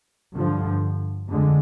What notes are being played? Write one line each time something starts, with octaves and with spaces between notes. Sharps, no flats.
G2 D3 F3
F2 D3 G#3